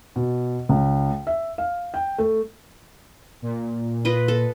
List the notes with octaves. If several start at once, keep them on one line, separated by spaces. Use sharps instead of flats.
B2
C#2
E5
F5
G5
A3
A#2
F4 B4 D#5
A4